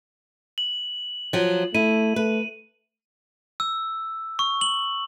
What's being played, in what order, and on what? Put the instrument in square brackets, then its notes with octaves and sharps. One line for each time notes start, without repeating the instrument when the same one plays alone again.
[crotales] F#7
[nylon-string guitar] F3 F#3
[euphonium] A3 [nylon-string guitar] E4 [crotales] D#7
[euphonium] A3 [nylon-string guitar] B4
[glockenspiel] E6
C#6
F#7